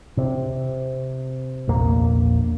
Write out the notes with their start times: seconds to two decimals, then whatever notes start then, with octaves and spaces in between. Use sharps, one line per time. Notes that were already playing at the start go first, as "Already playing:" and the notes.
0.17 C3
1.68 A#1 E2 A#3